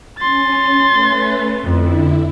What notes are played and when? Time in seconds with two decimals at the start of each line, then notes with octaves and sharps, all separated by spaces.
0.19 C#4 C6 A6
0.89 A3 C#4 B4
1.64 F2 D3 E4